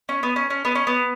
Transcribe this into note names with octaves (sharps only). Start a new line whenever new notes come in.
C#4
B3
C#4
C#4
B3
C#4
B3